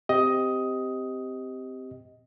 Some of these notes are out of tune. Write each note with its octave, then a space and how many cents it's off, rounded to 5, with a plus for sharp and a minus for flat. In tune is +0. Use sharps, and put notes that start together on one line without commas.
C4 -15 G4 +0 D#5 +10